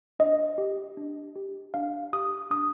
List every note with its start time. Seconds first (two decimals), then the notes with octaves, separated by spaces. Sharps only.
0.19 D4 D#5
0.58 G4
0.97 D4
1.36 G4
1.74 D4 F5
2.13 G4 D#6
2.51 D4 D#6